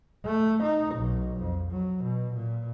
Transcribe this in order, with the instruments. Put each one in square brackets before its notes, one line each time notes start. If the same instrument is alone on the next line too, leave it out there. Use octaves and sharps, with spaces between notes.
[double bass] A3
D#4
B1
F2
F#3
B2
A#2